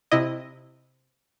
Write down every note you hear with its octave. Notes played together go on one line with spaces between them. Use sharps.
C3 E4 D#5